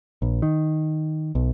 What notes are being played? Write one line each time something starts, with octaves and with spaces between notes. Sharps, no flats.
A#1
D#3
B1